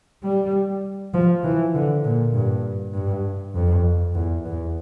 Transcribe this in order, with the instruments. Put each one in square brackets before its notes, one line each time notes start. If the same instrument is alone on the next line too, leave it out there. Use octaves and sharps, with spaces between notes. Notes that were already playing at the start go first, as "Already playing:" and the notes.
[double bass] G3
F3
E3
D3
A#2
G2
G2
F2
E2
E2